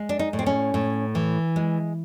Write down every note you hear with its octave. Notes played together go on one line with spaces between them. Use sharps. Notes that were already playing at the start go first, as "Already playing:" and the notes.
Already playing: G#3
D4
D#4
A2
C4
C#4
A2
E3
G#3